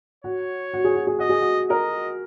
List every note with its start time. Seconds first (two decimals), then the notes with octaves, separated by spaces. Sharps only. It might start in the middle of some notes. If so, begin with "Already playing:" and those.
0.24 F#4 C#5
0.74 F#4
0.84 G#4
0.96 F#4
1.07 G#4
1.19 F#4 D#5
1.29 G#4
1.41 F#4
1.69 A#4 D#5